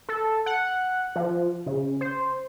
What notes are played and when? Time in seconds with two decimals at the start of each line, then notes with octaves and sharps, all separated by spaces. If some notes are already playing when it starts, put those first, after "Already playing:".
0.09 A4
0.46 F#5
1.16 F3
1.66 C#3
2.01 C5